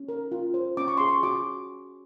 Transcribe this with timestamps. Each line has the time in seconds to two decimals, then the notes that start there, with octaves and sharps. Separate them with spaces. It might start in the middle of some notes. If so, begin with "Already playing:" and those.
Already playing: C#4
0.09 A#4
0.32 F4
0.54 C5
0.77 C#4 D6
0.88 C#6
0.97 G#4 C6
1.08 C#6
1.23 F#4 D6